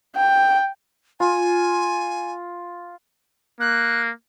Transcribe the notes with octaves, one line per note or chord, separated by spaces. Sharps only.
G5
F4 G#5
A#3 F#6